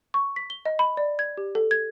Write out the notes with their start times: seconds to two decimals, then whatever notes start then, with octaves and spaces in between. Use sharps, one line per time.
0.14 C#6
0.36 B6
0.50 G7
0.65 D#5
0.79 B5
0.97 D5
1.19 G#6
1.37 G4
1.55 A4
1.71 G#6